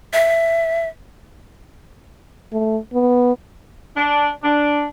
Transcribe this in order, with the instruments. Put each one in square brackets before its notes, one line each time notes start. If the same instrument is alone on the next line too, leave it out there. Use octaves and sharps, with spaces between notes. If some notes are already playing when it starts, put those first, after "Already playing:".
[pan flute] E5
[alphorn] A3
B3
[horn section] D4
D4